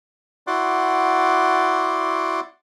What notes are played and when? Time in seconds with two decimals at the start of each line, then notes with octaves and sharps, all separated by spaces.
0.47 E4 F#4 D5 F#5 C6 D6